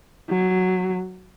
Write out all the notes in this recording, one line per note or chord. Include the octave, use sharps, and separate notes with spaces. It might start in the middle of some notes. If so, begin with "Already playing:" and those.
F#3